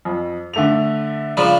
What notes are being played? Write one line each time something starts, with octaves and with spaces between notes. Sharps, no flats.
F2
D3 A3 F7
C#3 F3 D4 B5